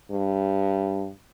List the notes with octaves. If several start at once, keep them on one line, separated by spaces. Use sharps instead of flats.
G2